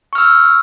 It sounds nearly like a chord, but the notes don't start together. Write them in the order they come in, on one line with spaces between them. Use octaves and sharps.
C#6 F6 E6